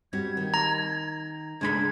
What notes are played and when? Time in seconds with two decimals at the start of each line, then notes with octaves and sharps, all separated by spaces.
0.13 G3 C4 F#4 G#6
0.37 D#3
0.54 A#5
1.61 C#2 G#3 A3 D4 B5 G#6